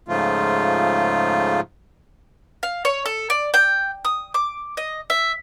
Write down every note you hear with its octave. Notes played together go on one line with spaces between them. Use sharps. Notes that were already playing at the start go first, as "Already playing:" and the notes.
G#2 C#3 F3 A3 F4
F5
C#5
A4
D5
G5
D#6
D6
D#5
E5